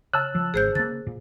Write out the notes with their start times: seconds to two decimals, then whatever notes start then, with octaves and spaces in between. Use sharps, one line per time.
0.14 C#3 A5 E6 F#6
0.35 F3
0.54 G#1 G#4 C5 G6
0.75 C#3 A#3 A6
1.07 A#2